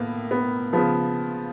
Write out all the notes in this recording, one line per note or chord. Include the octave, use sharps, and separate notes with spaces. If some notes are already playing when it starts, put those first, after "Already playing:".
Already playing: A2 A#3 B3
B3
C#3 F3 B3